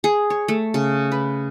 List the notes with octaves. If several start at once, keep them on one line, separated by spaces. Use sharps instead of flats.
G#4
C#5
A3
C#3
B4